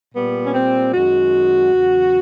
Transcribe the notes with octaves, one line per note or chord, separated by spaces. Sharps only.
A#2 G3 B3
C#4
C4
F#2 D#3 G#3 F#4
E2 C#3 F#3